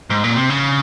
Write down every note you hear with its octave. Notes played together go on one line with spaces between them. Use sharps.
G#2
A#2
C3
C#3